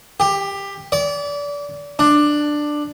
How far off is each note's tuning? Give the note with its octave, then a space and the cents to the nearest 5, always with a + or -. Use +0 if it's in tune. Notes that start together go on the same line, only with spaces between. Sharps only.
G4 +15
D5 -30
D4 +10